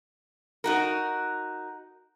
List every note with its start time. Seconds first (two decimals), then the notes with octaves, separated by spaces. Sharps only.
0.64 D#4 F#4 A#4